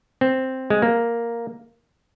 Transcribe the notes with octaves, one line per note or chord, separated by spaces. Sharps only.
C4
G#3
A#3